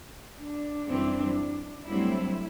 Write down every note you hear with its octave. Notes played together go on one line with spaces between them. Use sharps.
D4
F#2 E3 G3 C4
G2 F#3 A3 C4 E4